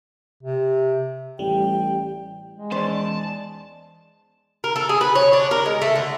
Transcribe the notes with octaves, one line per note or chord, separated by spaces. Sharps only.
C3
A1 G3 G5
G#3
E2 C#4 D#4 C5 D5 A5
A#4
A4
G#4
B4
C#5
D4
A#4
G#3
A3
D3